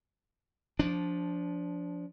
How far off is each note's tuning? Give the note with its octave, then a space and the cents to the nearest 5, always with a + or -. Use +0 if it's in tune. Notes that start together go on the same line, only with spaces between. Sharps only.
F3 +5 D4 -20